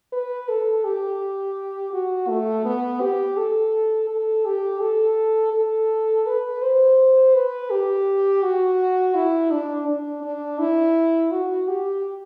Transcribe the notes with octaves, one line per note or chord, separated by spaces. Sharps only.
B4
A4
G4
F#4
A3
B3
G4
A4
A4
G4
A4
A4
B4
C5
B4
G4
F#4
E4
D4
D4
D4
E4
F#4
G4